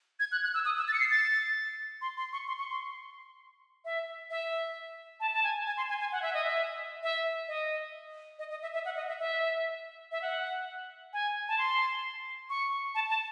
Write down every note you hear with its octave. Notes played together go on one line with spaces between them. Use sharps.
G#6
F#6
F#6
E6
D#6
E6
A6
C#7
C7
A6
C6
C6
C#6
C6
C#6
C6
E5
E5
A5
A5
G#5
G#5
C6
G#5
G#5
F#5
E5
D#5
E5
E5
D#5
D#5
D#5
E5
E5
F#5
D#5
E5
E5
E5
F#5
G#5
A5
C6
C#6
A5
A5